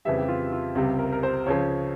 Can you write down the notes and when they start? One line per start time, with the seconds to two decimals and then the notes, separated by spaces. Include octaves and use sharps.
0.05 F2 C#3 E3 G3 E5
0.18 G4
0.28 F4
0.52 F4
0.75 C#2 C3 G3
0.99 A#4
1.12 A#4
1.23 C5
1.46 C#2 C#3 F3 C#5